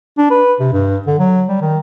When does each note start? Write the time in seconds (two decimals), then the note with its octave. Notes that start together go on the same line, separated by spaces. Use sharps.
0.18 D4
0.30 B4
0.60 C3
0.73 G2
1.07 D3
1.19 F#3
1.48 G3
1.62 D#3